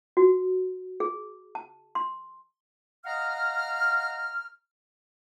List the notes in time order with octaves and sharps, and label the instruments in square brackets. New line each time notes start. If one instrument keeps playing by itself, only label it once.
[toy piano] F#4
G#4
A5
C6
[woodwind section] D#5 F5 F#5 A#5 F6